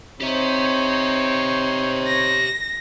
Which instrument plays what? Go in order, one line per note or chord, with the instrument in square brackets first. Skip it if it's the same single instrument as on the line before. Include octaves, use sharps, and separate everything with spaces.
[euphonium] C4 [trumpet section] D#4 C5 C#5 [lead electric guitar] G4 E5
[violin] A#6